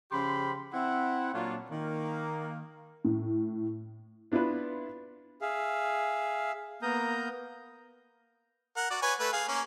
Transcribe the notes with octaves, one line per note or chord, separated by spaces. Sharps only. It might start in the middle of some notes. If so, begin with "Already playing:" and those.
C#3 F3 G4 B5 C6
C4 E4 F#5
A#2 F#3 A#3 D4 F4 C#5
D#3 A#3
A2
B3 D4 E4 F4 B4
G#4 E5 F5
A#3 B3 A#4 A#5 D#6 G6
A#4 F#5
F#4 D5
B4 C#5 G#5
A3 B4
G#4 F5
A#3 C#4 G#5